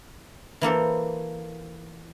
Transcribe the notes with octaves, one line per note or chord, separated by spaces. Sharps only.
E3 A#3 A4 C5